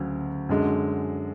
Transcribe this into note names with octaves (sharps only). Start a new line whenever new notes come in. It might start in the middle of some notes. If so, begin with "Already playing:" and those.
Already playing: D2 C#3 F#3
F#2 D3 G#3